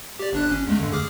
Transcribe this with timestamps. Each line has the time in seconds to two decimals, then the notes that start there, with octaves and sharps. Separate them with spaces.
0.19 G4 D5
0.33 G1 D4 F#6
0.51 C#4
0.67 E2 G#3 A3
0.79 G2 D3
0.92 G#4 D6 F6